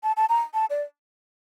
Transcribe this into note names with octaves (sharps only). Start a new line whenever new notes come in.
A5
A5
A#5
A5
D5